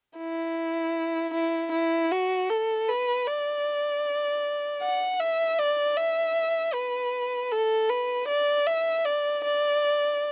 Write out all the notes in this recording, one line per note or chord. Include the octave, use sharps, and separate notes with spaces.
E4
E4
E4
F#4
A4
B4
D5
F#5
E5
D5
E5
B4
A4
B4
D5
E5
D5
D5